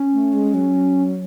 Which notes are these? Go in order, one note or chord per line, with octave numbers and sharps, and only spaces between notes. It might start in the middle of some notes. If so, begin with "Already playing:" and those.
Already playing: C#4
A3
G#3
F#3